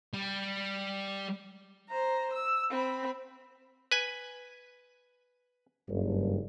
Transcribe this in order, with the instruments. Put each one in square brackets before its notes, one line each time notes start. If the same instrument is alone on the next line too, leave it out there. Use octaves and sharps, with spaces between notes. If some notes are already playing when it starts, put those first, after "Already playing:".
[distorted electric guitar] G3
[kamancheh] C5 A#5
E6
C4 B5
[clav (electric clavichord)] B4 G#5
[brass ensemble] F#1 G2